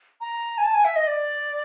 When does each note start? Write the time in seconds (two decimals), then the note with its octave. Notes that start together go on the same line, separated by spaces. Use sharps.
0.21 A#5
0.58 G#5
0.64 A5
0.74 G#5
0.85 E5
0.96 D#5
1.07 D5